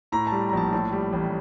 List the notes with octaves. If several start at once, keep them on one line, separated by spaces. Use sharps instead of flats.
A2 A#5
A5
G3
A#5
A#1 A5
A2 A5
G3
A1